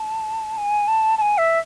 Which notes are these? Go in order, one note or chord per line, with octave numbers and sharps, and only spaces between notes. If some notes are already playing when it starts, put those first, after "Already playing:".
Already playing: A5
G#5
A5
A5
G#5
E5